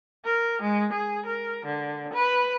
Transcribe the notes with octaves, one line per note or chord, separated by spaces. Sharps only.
A#4
G#3
G#4
A#4
D3
B4